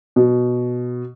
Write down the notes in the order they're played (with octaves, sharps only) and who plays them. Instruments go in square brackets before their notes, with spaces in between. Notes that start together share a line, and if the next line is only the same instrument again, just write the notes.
[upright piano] B2